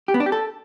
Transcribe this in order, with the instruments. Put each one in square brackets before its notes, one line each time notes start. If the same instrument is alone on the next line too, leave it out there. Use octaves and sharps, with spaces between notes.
[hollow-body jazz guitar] G4
B3
D4
G4
A4